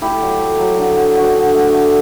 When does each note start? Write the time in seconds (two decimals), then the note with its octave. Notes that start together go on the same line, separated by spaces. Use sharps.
0.01 A3 E4 G4
0.21 F#3
0.40 A3
0.59 F#3
0.78 D3
0.97 F#3
1.17 D4 F#4
1.35 D3
1.54 A3
1.73 A3